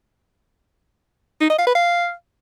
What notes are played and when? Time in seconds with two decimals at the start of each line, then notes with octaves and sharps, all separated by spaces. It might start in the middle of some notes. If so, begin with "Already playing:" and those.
1.41 D#4
1.50 D#5
1.58 F5
1.67 B4
1.75 F5